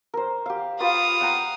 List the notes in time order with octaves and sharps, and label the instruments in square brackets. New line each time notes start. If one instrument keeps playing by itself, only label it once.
[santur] A#4 C5
G4 F5
[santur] F4 G4 B4 [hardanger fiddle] F5 D#6
[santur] F#5 G5 A#5